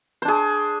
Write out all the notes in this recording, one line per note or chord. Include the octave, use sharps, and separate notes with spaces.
D4 G#4 C5